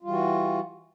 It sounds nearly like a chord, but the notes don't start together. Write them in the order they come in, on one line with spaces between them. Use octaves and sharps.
F4 G3 E3 F#4